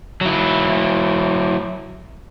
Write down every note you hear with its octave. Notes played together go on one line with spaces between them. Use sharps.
F#3 E4